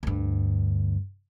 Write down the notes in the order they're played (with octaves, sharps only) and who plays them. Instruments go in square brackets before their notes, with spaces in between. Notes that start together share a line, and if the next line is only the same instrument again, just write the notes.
[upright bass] D2 G2